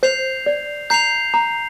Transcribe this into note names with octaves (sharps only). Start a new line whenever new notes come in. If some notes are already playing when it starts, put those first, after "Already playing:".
C5 G6 C7 F7
D5
A#5 G6 C7 F7
A#5